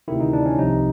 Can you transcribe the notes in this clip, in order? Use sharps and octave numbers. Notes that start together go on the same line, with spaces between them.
D2 C3 D#3 E4
D#4
D4
C#4
C2 C3 F3 D#4